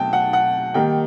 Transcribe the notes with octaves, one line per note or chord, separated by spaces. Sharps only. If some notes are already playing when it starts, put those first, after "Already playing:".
Already playing: B2 F#3 A3 G5 A5
F#5
F#5
D#3 G3 A#3 D#4 G5